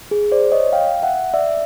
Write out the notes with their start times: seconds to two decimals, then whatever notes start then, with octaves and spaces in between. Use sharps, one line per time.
0.11 G#4
0.32 C5 D5
0.52 C#5 D#5
0.72 F5 G5
1.03 E5 F#5
1.34 D5 E5